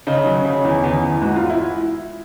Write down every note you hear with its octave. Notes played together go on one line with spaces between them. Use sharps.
C#3 D#4
F#3
C#3
E2
E2
E2
G#2 F#4
F4
E4